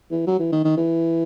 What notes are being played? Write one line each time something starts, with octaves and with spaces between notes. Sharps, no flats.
E3
F#3
E3
D#3
D#3
E3